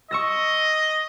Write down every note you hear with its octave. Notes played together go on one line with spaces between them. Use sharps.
D#5 C#6 E6 A#6